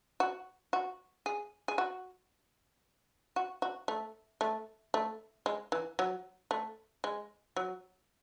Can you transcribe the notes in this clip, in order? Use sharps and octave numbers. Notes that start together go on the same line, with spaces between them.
F#4
F#4
G#4
G#4
F#4
F#4
F#4
A3
A3
A3
G#3
E3
F#3
A3
G#3
F#3